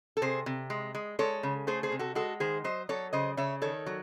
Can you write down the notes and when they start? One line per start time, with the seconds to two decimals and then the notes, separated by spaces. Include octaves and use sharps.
0.17 A4
0.22 C3 G#4 C5
0.46 C3
0.70 G#3
0.95 G#3
1.19 G#3 A4 C#5
1.43 C#3
1.67 A3 G#4 C5
1.83 G#4 C5
1.92 C3
1.99 F#4 A4
2.15 G#3 F#4 A4
2.40 D#3 G#4 C5
2.64 F#3 C5 D#5
2.89 F#3 A4 C#5
3.13 C#3 C5 D#5
3.37 C#3 C#5 E5
3.62 D#3 A4 C#5
3.86 F#3